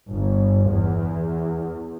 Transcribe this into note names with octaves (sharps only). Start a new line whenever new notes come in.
G1
E2